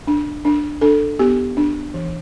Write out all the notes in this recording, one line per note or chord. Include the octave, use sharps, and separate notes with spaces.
D4
D4
D4 A4
B3 G4
D4
E3